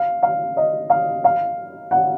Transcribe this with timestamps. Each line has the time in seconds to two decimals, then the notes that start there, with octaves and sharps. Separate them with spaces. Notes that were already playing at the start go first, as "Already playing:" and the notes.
Already playing: F5
0.23 F5
0.57 D#5
0.90 F5
1.24 F5
1.91 F#5